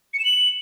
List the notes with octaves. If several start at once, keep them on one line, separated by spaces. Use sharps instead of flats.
C#7
E7
F#7